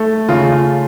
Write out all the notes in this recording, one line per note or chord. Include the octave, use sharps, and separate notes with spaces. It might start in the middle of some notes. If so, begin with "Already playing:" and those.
Already playing: A3
C#3 F4
F4